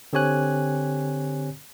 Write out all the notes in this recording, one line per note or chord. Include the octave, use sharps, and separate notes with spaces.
D3 C4 G4 C#5 G#5 F#6